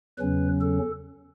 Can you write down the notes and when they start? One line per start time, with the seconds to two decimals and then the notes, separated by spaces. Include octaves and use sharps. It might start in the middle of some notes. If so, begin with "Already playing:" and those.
0.18 E2 C#3 F#3 C#4 B4
0.61 A4